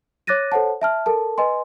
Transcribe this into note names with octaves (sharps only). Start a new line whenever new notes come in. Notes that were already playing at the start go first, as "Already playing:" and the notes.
C#5 D6 F#6 A6 A#6 D#7
A4 C5 C#5 F#5 A5
E5 A5 F6
A4 A#4 A5
B4 D#5 G#5 C6